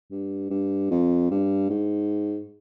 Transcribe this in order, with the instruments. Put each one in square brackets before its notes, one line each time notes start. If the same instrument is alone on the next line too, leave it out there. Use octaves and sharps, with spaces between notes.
[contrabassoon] G2
G2
F2
G2
G#2